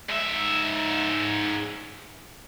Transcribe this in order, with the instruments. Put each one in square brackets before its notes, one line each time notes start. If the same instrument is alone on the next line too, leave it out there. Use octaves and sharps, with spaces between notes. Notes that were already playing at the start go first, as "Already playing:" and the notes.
[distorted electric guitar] G#2 E5